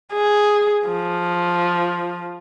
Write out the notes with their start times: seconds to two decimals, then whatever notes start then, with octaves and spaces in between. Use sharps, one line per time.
0.13 G#4
0.88 F3